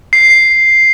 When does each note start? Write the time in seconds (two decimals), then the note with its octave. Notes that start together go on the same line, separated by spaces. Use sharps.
0.13 C7